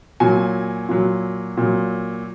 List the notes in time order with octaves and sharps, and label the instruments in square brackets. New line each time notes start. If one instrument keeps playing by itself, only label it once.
[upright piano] A#2 F#3 G#5
A#2 F#3
A#2 F#3